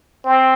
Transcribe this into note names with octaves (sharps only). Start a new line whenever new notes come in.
C4